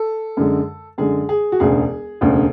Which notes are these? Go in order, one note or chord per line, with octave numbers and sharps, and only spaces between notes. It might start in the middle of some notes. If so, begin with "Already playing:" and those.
Already playing: A4
F#2 D3 G#3
F#2 D3 G#3 G#4
G#4
F#4
E1 D2 C#3 G#4
E1 D2 C#3